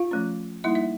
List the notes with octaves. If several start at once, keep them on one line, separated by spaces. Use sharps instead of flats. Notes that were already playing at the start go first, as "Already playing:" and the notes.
Already playing: F4 F5
F3 A3 C#4
G3 A#3 D#4 E4 E5
E5